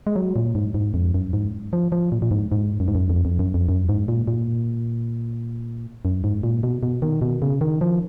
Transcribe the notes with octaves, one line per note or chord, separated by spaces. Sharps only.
G#3
F#3
A#2
G#2
G#2
F2
F#2
G#2
F3
F3
A#2
A#2
G#2
G#2
F#2
G#2
F#2
F2
F2
F#2
F2
F#2
G#2
A#2
A#2
F#2
G#2
A#2
B2
B2
D#3
B2
C#3
D#3
F3